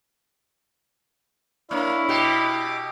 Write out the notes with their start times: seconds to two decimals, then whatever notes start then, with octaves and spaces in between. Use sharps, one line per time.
1.71 A#3 D4 E4 C#5 F5
2.09 B2 G4 D6